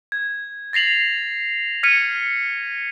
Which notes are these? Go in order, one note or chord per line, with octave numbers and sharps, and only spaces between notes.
G#6
A6 A#6 C7 F7 F#7
F6 G#6 B6 C#7 D#7